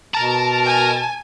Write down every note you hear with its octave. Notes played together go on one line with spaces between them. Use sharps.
B2 A#4 A5 A#5
G#5